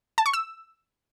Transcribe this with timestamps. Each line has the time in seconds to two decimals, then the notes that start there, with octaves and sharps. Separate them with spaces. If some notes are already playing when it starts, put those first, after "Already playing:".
0.18 A5
0.26 C#6
0.33 E6